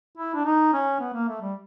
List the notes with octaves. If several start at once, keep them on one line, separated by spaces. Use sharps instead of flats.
E4
D4
D#4
C#4
B3
A#3
A3
G3